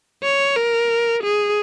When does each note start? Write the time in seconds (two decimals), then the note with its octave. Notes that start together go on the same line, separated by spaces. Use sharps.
0.23 C#5
0.56 A#4
1.24 G#4